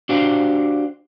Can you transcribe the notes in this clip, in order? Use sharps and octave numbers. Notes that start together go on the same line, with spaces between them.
D4 F#4 G4 C5 F5